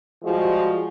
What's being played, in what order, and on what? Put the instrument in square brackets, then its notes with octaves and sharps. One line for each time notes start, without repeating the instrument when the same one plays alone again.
[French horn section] F3 G3 G#3 F4 F#4